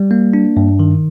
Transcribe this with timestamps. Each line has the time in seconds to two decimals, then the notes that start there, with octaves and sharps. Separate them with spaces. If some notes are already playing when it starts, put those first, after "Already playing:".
Already playing: G3
0.11 A#3
0.33 D4
0.57 G2
0.79 D#3